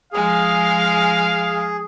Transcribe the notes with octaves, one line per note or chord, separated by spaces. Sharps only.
F3 G#3 G#4 F5